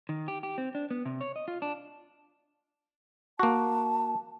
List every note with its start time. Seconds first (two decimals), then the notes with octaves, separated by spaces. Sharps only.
0.09 D#3
0.28 G4
0.43 G4
0.58 C4
0.75 D4
0.91 B3
1.06 C3
1.21 C#5
1.36 D#5
1.48 F4
1.62 D4
3.39 A#3 F#4 A5